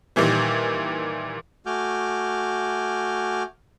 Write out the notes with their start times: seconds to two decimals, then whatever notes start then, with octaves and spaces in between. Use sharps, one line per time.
0.16 A#2 D#3 E3 G3
1.66 A3 F#4 G#5 D6 F6 G6